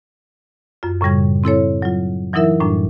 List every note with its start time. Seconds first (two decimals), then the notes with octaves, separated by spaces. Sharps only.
0.83 F#2 F4
1.01 F#2 A2 C#3 G3 G#6
1.44 C4 E4 A4 C#5
1.82 F#3 F4
2.33 E3 F#3 D#4 E4 A#4 E5
2.61 F#2 A2 G3 D4